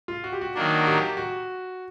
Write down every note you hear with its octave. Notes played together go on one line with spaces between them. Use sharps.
F4
F#4
G4
F#4
D#3 F#3 A#3 D4
G4
F#4